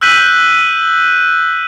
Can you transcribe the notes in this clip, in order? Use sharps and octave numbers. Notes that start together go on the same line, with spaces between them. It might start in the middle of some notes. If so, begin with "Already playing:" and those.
E6 F#6 G6 B6 D#7 F#7